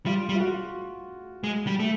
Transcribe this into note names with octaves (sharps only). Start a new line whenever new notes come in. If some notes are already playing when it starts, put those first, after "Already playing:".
G3 F4
G3
F4
F#4
G#3
G3
A3